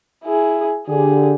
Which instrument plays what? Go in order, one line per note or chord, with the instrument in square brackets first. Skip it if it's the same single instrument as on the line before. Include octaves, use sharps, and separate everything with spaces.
[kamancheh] E4 G#4
[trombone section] D3 G4 [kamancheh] G#4